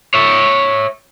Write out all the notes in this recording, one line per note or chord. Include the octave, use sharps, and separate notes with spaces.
C#5 E5